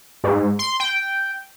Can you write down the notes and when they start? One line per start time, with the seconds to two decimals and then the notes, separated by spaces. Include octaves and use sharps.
0.24 G#2
0.59 C6
0.80 G5